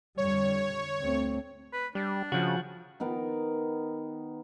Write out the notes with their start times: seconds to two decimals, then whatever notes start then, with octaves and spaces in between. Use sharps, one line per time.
0.18 F2 D3 G3 C#5
1.00 D2 A3 C4
1.73 B4
1.95 G3 D4
2.32 C#3 F3 F#4
3.00 D#3 B3 A#4